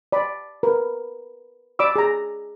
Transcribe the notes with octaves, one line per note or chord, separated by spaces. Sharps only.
D5 B5
A#4 B4
D5 B5 D6 E6
G#4 A#5